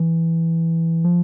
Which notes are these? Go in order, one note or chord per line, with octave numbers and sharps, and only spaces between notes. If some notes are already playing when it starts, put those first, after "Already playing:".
Already playing: E3
F3